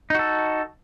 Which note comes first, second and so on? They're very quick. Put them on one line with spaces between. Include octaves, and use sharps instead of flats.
D#4 F#4 A4